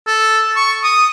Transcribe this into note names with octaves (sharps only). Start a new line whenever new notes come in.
A4
C#6
D#6